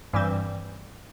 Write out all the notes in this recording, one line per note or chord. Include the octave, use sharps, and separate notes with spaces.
G2 E3 G3 C4